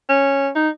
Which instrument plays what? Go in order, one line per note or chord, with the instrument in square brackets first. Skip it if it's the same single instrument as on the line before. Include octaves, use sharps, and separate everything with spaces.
[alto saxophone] C#4
D#4